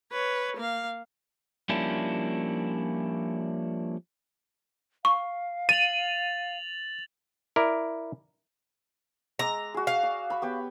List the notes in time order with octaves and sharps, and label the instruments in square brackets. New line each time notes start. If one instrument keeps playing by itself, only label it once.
[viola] B4 C#5
A#3 F5
[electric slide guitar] F3 G3 A#3 C#4 D4 E4
[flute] F5 [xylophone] C#6
[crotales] A6 F7 F#7 [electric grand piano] D#7
[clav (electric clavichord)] E4 A#4 D5
[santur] G#3 D6 E6 [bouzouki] A#5
[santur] F#4 G#4
[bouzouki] F5
[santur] D5
B5 C#6
B3 G4 C#5